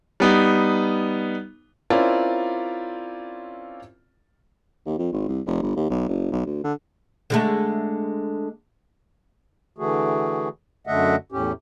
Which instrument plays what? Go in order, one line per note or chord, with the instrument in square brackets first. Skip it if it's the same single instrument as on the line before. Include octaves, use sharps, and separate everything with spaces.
[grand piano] G3 B3 D#4
[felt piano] C4 C#4 E4 F4 A#4 D5
[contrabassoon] D#2
F2
G#1
C2
F1
G1
D#2
B1
F#1
B1
D2
D3
[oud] D3 G#3 A3
[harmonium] D3 E3 A3 F#4 G#4
F#2 D3 A3 D#5 E5 F#5
E2 A2 C#4 G4